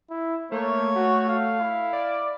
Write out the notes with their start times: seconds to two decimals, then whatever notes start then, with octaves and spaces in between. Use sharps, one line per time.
0.10 E4
0.52 A3 A#3 C#5
0.96 A3 F#4
1.29 F5
1.59 E4
1.93 D5